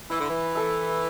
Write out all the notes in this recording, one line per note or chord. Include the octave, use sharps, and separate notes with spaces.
E3 E4
D3
E3
A4 E5